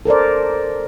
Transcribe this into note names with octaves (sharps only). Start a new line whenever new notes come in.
A4 A#4 C5 D5